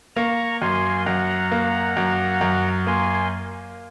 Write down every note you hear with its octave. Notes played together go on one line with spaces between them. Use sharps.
A#3 A#5 C#6
F#2 G#5 C6
F#2 F#5 A#5
A#3
F#2
F#2
A#3 G#5 C6